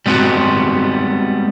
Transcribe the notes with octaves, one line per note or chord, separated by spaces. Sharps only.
G3 G#3 B3 C4 F#4